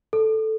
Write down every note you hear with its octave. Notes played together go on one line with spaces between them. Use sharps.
A4